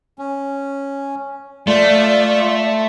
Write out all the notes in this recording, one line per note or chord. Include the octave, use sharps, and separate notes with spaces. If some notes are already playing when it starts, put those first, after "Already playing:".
C#4
A3 F4 D5